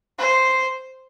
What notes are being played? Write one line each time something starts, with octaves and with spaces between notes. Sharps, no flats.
C5